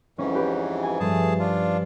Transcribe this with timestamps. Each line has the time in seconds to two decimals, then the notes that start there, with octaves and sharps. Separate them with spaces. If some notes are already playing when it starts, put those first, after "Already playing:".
0.18 F2 G#2 E3 C#4
0.35 G4 B4
0.83 G#5
1.00 G2 F3 A3 G#4 A5
1.40 D4 F4